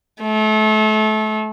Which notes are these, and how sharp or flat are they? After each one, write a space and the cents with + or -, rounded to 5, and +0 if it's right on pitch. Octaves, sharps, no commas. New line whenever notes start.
A3 -30